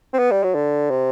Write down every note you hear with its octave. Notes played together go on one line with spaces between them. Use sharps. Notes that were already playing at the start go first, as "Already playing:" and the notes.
C4
B3
G3
F#3
D3
C3